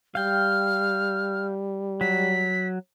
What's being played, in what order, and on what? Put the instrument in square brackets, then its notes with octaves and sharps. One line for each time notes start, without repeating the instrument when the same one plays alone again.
[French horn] G3 [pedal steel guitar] F5 G5 [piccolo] F6
[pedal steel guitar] F#3 [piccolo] B6